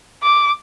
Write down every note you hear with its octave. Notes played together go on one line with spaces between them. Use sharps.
D6